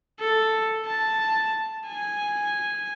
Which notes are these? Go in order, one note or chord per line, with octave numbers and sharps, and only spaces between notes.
A4
A5
G#5